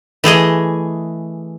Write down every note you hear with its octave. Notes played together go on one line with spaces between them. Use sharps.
E3 A3 G#4 D#5